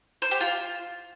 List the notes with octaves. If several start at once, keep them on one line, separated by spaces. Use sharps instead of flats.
C5
G4
F4